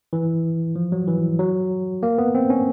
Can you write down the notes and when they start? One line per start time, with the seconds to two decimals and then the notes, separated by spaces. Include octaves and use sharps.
0.13 E3
0.76 F3
0.92 F#3
1.07 E3
1.39 F#3
2.03 A#3
2.18 B3
2.35 C4
2.50 C#4